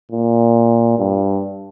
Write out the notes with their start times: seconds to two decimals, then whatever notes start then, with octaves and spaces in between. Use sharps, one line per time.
0.12 A#2
0.98 G2